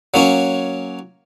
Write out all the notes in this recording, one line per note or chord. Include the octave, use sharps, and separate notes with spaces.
F#3 A#3 C#4